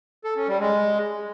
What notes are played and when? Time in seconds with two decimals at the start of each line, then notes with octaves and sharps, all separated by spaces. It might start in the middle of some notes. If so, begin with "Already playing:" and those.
0.24 A4
0.36 C#4
0.48 G3
0.60 G#3